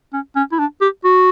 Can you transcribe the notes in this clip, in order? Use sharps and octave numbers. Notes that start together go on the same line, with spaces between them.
C#4
C#4
E4
D4
G4
F#4